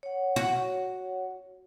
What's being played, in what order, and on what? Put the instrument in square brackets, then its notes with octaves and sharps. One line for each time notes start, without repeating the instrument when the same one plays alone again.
[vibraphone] C#5 F#5
[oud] F#4